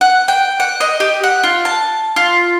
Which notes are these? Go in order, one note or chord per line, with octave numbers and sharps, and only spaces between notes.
F#5
G5
F#5
D#5
G4
F#5
F4
A5
F4